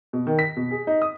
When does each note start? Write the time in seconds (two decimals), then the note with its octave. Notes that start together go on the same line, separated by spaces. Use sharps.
0.13 B2
0.27 D#3
0.39 B6
0.56 B2
0.71 G#4
0.87 D#4
1.02 D#6